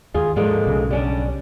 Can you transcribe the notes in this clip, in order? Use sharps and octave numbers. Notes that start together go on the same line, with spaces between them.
D#2 F4 G#4
G#2 D3 F3 G#3 A#3
B1 C#3
G3 C#4 D4